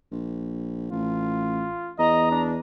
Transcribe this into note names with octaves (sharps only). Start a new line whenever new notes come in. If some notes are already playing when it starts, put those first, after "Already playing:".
A#1
A1 F4
E2 D#5 A#5
D4